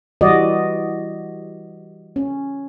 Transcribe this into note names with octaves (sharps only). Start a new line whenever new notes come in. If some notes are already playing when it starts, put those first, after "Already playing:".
E3 G3 F#4 D5 D#5
C#4